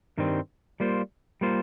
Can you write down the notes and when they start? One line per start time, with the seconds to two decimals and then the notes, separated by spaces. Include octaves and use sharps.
0.18 G2 D#3 G3 C4
0.80 G3 A#3 F4 C5
1.41 G3 A#3 F4 C5